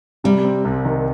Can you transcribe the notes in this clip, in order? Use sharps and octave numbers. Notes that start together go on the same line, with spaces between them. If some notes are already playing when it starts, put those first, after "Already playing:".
C3 G3
C4
C2
D#3